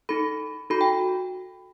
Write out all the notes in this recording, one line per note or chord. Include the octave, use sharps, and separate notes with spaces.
D#4 A4 B5
D#4 F#4 A4 B5
G5